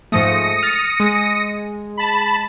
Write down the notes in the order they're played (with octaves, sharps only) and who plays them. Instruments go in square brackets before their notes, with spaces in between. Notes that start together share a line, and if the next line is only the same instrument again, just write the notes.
[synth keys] G#2 F3 A3 [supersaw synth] D#6 A#6 C#7
[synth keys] F6 A6
G#3
[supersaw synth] A5 B5